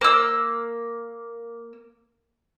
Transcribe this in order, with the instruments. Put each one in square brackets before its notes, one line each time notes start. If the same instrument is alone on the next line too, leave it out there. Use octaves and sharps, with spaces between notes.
[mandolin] A#3 E6